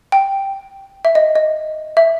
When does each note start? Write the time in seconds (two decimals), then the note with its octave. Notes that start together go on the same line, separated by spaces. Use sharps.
0.12 G5
1.05 E5
1.15 D#5
1.35 D#5
1.97 E5